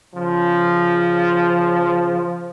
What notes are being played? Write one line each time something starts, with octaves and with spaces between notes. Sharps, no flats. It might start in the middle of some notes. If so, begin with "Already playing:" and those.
C#3 F3